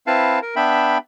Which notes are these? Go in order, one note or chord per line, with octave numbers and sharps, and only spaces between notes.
C4 E4 B4 F5 A5
A#4
B3 D4 E5 G5 B5